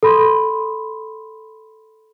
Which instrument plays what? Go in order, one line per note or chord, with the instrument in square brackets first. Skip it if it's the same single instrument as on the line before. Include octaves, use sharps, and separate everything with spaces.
[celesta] A4 B5 C6